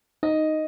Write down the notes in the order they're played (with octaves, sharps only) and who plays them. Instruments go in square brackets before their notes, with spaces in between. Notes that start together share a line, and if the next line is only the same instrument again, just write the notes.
[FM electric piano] D#4 [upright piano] D#5